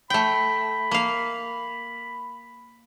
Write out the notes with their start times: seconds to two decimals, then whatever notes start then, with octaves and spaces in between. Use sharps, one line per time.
0.10 A3 G5 B5
0.91 A#3 F5